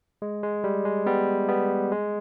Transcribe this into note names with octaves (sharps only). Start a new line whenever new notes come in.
G#3
G#3
G3
G#3
G3 B3
G3 B3
G#3